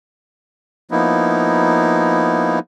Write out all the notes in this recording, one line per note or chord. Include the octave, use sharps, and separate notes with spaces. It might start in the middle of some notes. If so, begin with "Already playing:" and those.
F3 A#3 B3 D#4 E4